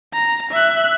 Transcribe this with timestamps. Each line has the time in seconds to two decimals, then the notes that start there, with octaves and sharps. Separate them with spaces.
0.14 A#5
0.51 E5 F#6